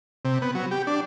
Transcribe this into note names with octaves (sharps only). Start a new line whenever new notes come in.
C3
B3
F#3
G4
D4